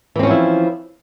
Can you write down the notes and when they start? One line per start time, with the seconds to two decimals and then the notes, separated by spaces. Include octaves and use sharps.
0.16 E3
0.19 C4
0.23 C#4
0.27 F3
0.31 E4